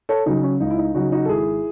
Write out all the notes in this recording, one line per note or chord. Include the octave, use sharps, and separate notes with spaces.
A4 C#5
C#3 F#3 D#4
C#4
C#2 D#4
E4
D#4
C#3 F#3 D#4 F#4
D#4 F#4
A4
G#1 E4 G#4